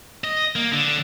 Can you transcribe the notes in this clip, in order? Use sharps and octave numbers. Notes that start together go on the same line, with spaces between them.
D#5
A#3
D3